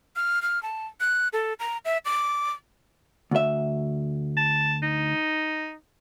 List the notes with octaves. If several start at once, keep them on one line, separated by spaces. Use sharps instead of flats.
F6
F6
A5
F#6
A4
A#5
E5
D6
D2 E5
A5
D#4